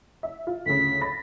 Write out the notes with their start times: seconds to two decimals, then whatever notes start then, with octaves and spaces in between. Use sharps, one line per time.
0.23 E5
0.47 F4
0.66 D2 C#3 B6
1.01 B5 A6 A#6